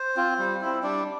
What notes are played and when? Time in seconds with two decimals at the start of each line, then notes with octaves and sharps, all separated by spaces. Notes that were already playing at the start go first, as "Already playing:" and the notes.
Already playing: C5
0.16 C4 F4
0.39 G3
0.61 C4 E4
0.83 G3 D4 D5